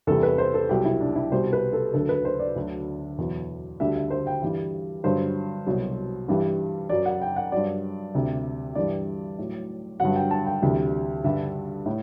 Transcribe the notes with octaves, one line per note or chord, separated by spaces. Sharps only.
E2 C3 G3 A4
B4
C5
A4
C2 B2 F#3 G4
E4
D4
E4
C2 B2 G3 C5
B4
A4
D2 D3 F#3 A4
B4
C5
D5
D2 D3 F#3
E2 B2 F#3
D2 D3 G3 E5
E5
C5
G5
G2 E3 G3
G2 D3 F#3 C5
C2 B2 F#3
G2 E3 G3
F#2 F#3 D5
F#5
G5
F#5
G2 F#3 D5
D2 C3 G3
G2 E3 G3 D5
A2 F#3
G2 D3 F#3 F#5
G5
A5
G5
D2 C3 E3 G3
G2 D3 G3 E5
A2